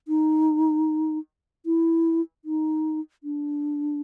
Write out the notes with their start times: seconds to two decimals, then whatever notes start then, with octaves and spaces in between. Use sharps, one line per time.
0.08 D#4
1.66 E4
2.45 D#4
3.24 D4